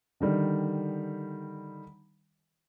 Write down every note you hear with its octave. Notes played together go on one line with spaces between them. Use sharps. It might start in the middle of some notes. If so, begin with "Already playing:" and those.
D3 D#3 G3